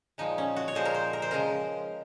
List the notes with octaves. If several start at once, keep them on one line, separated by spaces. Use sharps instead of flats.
A#2 F3 G#3 D#4
C#4
F#4
C#5
A#2 F3 G#3 C5
A#4
C5
A#4
C5
C#3 F3 G#3 A#4